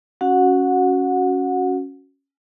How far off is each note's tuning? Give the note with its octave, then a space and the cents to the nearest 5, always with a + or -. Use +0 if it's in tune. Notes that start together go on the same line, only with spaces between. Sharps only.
C#4 +0 F#4 +0 F#5 -20